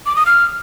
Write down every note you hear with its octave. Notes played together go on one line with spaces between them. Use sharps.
D6
D#6
F6